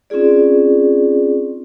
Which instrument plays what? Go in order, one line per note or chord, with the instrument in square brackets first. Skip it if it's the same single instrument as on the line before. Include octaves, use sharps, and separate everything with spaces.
[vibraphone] C4 C#4 D#4 F4 G#4 D5